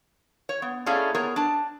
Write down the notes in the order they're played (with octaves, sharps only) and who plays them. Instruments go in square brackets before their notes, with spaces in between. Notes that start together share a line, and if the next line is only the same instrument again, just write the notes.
[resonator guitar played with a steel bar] C#5
B3
A2 A3 A#3 C#4 G#4 D5
B3 G#4 A#4 C#5
D4 A5